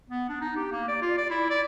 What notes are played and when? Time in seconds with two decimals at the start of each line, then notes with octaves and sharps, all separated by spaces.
0.08 B3
0.29 D4
0.41 D#4
0.56 G4
0.71 A#3
0.88 D5
1.02 F4
1.17 D5
1.30 E4
1.50 D5